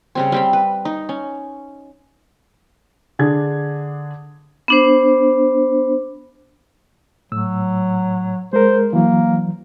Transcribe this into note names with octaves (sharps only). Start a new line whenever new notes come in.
C#3 G3 C4
G3 C4 B5
B4
D#4
C#4
D3 D4 G#4 G#6
B3 D4 C5
A2 F#3 E6
G#3 A#4 C5
E3 F#3 A#3